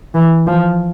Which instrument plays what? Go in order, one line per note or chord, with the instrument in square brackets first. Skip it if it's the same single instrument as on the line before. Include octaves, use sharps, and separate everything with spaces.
[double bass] E3
F3